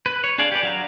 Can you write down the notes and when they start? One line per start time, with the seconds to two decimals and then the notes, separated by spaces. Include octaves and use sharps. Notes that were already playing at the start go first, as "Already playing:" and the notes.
0.06 B4
0.24 C#5
0.38 D4 G#4 A4 D5 F5
0.52 G4 B4 D5
0.63 F#3 F5 A#5